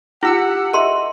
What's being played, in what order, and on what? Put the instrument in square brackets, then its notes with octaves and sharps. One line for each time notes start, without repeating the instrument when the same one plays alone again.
[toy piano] E4 [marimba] F4 G5 F#6 [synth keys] G4 E6 C#7 [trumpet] F#5
[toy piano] A#4 C6 [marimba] D#5 E5